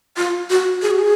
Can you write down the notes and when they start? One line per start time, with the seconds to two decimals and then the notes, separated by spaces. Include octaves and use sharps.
0.17 F4
0.50 F#4
0.82 G#4
0.91 F#4
0.99 G#4